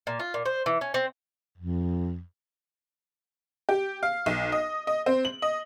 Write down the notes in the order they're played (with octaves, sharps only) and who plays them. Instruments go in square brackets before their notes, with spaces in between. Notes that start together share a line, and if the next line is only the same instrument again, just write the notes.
[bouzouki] A#2
F4
A#2
C5
E3
C#4
C4
[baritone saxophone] F2
[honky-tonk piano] G4
F5
B1
D#5
D#5
C4
F#7
D#5